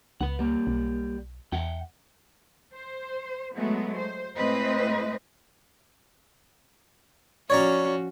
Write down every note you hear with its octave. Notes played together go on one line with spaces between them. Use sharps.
C#2 B4 F#5
G3 A#3
B1
E2 E5 F#5 G5
C5
F#3 G#3 A3 B3
C5
A2 G#3 C4 B4 C5 D#5
F3 C#4 F#4 C#5 D5 A#5